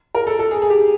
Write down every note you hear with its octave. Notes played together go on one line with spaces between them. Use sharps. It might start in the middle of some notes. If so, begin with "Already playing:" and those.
A#4
A4
A4
G#4
G#4
G4